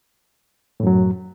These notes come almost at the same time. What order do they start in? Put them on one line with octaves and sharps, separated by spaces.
A2 F#2 F#3